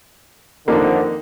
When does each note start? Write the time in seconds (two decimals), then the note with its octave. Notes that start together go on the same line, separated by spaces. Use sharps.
0.68 F2 D3 D#3 A#3 D#4